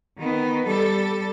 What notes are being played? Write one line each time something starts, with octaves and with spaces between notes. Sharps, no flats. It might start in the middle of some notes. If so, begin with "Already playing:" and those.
D#3 B3
G3 A4